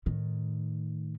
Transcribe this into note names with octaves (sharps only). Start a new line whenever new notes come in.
A2 D#3